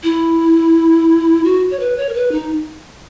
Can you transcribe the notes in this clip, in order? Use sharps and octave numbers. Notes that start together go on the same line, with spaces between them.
E4
F#4
C#5
B4
C#5
A#4
B4
D#4